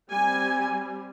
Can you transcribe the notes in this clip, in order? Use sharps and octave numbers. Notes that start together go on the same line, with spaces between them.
G3 C4 G#5